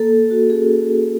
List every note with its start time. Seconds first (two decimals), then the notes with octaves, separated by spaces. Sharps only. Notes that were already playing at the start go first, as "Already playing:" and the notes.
Already playing: A#3 A4
0.11 A#3
0.31 F#4
0.50 C#4 G#4